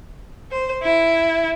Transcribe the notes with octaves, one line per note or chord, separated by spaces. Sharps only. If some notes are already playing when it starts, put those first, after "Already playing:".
C5
E4